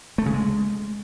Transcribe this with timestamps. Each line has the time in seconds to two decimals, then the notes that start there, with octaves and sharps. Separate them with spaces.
0.18 A3
0.26 C#3
0.34 G#3